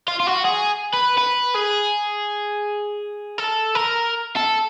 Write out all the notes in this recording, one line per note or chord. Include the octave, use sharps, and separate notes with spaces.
F4
F4
F#4
G#4
B4
B4
G#4
A4
A#4
A4